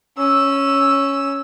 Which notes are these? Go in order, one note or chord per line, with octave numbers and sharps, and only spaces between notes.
C#4 E6